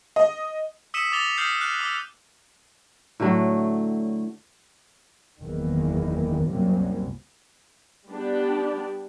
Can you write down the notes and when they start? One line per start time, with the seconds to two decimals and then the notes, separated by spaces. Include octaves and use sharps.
0.16 D#5
0.94 D#6 E6 B6 C#7 D#7 E7
1.12 D6 D#6 A6 F7 G7
1.38 D#6 F6 G6 B6 C7
1.61 F6 F#6
1.81 D6 E6
3.20 A2 D3 F#3 A3
5.40 F#1 E2 D#3 E3 A#3
6.47 C2 F#2 C3 F#3 G3 A#3
8.08 G3 B3 D4 G4